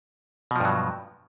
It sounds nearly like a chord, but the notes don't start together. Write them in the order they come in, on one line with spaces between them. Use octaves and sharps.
B2 F3 G2 F#3